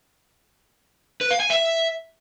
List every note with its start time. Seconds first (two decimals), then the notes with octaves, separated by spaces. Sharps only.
1.21 B4
1.31 F5
1.40 G#5
1.50 E5